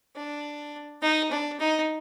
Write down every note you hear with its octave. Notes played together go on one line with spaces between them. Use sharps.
D4
D#4
D4
D#4